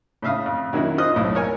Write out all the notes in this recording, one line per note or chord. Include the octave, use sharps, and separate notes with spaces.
A2 C#3 E5 F5 D#6
F2
D#3 F#3 A#3 C#4 E4
F4 C5 D#5 D#6 F#6
B1 A2
A#4 C#5 G#5